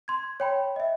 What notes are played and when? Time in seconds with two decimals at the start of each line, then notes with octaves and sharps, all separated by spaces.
0.08 C6 G#6
0.40 C#5 G5 B5
0.76 D#5 E5